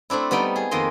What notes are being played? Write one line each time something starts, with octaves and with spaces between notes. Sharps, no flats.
A3 C4 D4 E4
G3 B3 D#4 G5
G#4
F2 D#3 A#3 D#5 C6